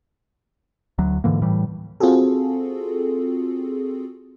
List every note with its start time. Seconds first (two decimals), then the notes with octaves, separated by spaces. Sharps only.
0.98 D2 F#3
1.24 G#2 D3 E3 A#3
1.42 A2 E3 G3
2.00 C4 F4 F#4 G#4 A4